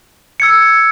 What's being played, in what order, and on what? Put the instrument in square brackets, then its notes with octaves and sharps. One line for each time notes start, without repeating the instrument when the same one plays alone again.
[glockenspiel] E6 G#6 C#7